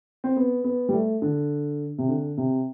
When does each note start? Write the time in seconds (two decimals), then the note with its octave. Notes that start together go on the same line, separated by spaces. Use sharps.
0.24 C4
0.37 B3
0.64 B3
0.89 G3
0.93 A3
1.22 D3
1.98 C3
2.09 D3
2.37 C3